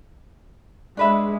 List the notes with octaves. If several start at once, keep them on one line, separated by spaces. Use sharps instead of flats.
G#3 D4 B4 E5